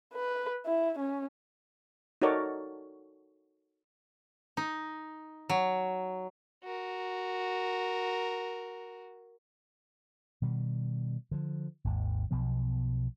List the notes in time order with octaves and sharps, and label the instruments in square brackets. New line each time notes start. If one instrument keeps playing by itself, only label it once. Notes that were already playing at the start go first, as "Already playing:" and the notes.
[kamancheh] B4
E4
C#4
[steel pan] D#4 F#4 A4 A#4 C#5 D5
[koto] D#4
F#3
[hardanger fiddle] F#4 A#4
[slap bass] B2 D#3 G3
D3 F3
G#1 D#2 G#2
B1 B2 F3 B3